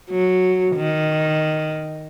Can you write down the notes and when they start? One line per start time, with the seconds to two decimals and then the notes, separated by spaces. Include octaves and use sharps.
0.10 F#3
0.76 D#3